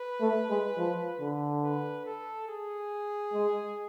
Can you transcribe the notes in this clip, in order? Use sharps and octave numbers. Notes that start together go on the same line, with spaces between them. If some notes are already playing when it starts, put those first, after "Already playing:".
Already playing: B4
A3
G#3
F3
D3
B4
A4
G#4
G#3